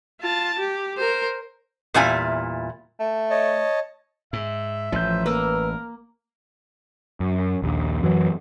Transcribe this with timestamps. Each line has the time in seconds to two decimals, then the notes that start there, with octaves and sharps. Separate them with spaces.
0.22 F4 A5
0.59 G4
0.97 A#4 C5
1.94 E2 A#2 G3 E4 F4 G#5
3.00 A3
3.30 C#5 D#5 A5
4.33 G#2 E5
4.92 A1 F3 G6
5.26 A#3 A#4 B4 E6
7.20 F#2
7.62 A#1 D#2
8.03 F#2 E3 F#3